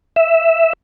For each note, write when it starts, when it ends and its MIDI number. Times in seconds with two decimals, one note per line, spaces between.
0.16 0.73 76